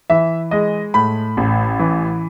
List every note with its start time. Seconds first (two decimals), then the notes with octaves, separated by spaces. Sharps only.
0.10 E3 E5
0.51 G#3 D#5
0.94 A2 B5
1.37 A1
1.79 E3